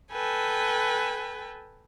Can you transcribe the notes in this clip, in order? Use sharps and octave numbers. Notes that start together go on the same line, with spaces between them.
A4 B4 G5 G#5